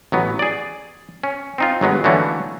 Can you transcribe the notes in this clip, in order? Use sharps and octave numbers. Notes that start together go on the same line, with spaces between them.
A1 F#3 B3
G#4 D5
C#4
C4 D#4 F4
G1 F#3 G#3 B3
D3 E3 F#3 A3 A#3 C#4